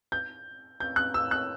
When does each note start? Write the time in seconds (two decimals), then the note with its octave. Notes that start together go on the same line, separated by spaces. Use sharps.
0.12 G6
0.80 G6
0.96 F#6
1.14 E6
1.31 F#6